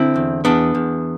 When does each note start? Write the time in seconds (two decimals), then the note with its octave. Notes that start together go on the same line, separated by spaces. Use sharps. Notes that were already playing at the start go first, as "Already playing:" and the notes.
Already playing: D3 C4 E4
0.16 E2
0.45 E2 B3 D4
0.75 E2